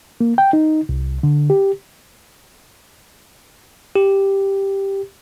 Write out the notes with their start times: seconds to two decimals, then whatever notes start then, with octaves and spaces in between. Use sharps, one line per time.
0.21 A#3
0.38 G5
0.53 D#4
0.89 C2
1.23 D3
1.50 G4
3.96 G4